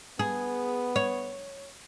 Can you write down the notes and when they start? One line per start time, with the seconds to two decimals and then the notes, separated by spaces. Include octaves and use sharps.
0.19 B3 G#4
0.96 C#5